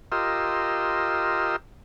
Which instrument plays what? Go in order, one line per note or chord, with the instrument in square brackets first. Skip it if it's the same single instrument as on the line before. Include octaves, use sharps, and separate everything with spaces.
[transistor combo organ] F4 G4 A#4 D#5 C6 E6